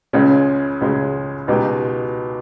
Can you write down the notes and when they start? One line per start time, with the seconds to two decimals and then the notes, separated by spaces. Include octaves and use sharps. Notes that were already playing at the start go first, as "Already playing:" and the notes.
0.13 C#2 C#3 G#3 C#4 G#4
0.81 C#2 C#3 G#3 C#4 G#4
1.48 C#2 B2 G#3 D#4 G4